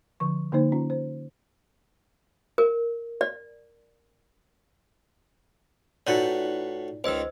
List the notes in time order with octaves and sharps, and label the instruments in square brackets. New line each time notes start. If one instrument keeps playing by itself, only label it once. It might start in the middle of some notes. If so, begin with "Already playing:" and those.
[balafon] D3 F3 C#6
D3 A#3 D#4 C5
C#4 F4
C5
[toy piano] A#4
D5
[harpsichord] A2 F#4 B4 [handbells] D#4 F4 D5
[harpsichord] C#2 D#3 [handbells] C5 D#5 E6